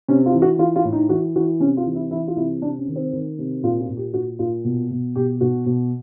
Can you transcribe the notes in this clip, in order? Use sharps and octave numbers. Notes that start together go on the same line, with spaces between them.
C3 C#4
F4
E3
F#4
E3 F4
F4
A2
D#4
E3 F#4
E3 F#4
C3 C#4
F4
E3
E4
E3 E4
F4
C3 E4
C3 D4
C#4
D#3
C4
D#3
C3
A#2 F4
F4
A#2
G4
A#2 F#4
A#2 F4
B2
B2
B2 G4
B2 F#4
B2